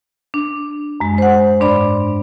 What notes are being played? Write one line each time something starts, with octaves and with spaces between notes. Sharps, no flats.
D4
F#2 G#3
C5 F#5
G#2 D4 D5 B5